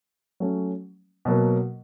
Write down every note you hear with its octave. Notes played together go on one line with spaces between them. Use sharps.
F#3 A3 C#4
B2 F#3 A#3